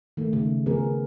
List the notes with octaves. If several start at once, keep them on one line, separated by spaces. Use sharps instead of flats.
D#3 A3
C#3
C#3 F3 B3 G#4 A#4